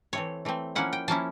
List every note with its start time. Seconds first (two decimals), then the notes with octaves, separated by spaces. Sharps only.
0.13 E3 A3 C4 C#5
0.45 E3 A3 C4
0.75 F3 A#3 C#4 E4 F#5
0.93 G5
1.08 F3 A#3 C#4 E4 A5